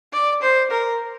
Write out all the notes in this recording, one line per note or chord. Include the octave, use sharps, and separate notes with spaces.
D5
C5
A#4